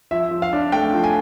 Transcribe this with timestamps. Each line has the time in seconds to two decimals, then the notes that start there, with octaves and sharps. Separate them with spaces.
0.11 F3 E5
0.31 F3
0.42 F5
0.53 D4
0.72 A3 G5
0.93 F3
1.04 G#5